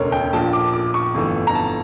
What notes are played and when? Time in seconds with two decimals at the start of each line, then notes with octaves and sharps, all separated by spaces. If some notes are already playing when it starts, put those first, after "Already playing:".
Already playing: E1 D2 C#3 A4 A#4 C#5
0.12 G5
0.33 A#1 A#2 F3 A5
0.53 D6
0.74 D6
0.94 C#6
1.14 G1 F2 E3 A3
1.47 A#5
1.55 A5